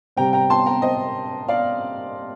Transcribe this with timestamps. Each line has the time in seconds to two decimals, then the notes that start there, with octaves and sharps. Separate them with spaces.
0.16 C3 G3 C4 G5 A#5
0.33 G5 A#5
0.50 A5 C6
0.66 G5 A#5
0.82 C5 D#5
1.48 D5 F5